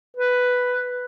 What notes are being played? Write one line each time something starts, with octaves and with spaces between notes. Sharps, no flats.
B4